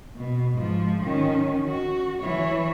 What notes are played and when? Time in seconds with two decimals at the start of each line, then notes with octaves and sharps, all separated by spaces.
0.16 B2
0.55 G#2 F3
1.02 D#3 C#4
1.67 F#4
2.22 E3 C#5